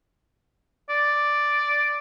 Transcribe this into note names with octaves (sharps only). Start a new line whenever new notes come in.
D5